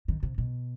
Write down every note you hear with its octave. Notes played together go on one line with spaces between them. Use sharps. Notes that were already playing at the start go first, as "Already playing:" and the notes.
D#3
C3
B2